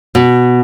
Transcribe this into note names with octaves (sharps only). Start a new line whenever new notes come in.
B2